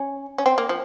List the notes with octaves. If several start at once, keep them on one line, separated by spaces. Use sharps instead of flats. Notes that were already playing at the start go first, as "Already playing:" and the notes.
Already playing: C#4
C#4
C4
A#3
F3